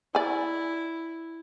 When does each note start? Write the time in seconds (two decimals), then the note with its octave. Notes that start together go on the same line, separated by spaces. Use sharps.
0.15 E4 D5 G#5